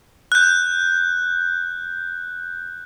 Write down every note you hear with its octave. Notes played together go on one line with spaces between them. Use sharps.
F#6 G6